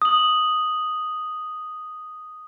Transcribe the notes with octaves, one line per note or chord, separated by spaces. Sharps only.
D#6 F#7